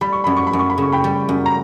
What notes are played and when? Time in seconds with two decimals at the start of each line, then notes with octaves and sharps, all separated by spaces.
0.01 G3 B5
0.12 C#6
0.24 F#2 B5
0.37 C#6
0.47 B5
0.53 F#2
0.59 C#6
0.70 B5
0.78 C#3 C#6
0.92 G5 B5
1.04 G3
1.29 F#2
1.46 A#5